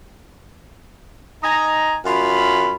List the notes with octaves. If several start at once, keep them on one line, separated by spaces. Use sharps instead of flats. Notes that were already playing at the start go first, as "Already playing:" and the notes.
D#4 D#5 G#5 A#5
F#2 F4 C#5 B5